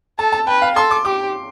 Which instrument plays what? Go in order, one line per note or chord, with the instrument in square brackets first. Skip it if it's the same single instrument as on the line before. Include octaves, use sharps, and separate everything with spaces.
[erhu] A4 [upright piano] A5
[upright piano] A5
[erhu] B4 [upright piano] G5
[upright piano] F5
[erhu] A4 [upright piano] C6
[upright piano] D6
[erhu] G4 [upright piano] D6